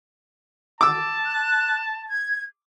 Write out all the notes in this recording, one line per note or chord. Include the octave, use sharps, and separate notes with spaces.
A5 D6 E6
F#6
G#6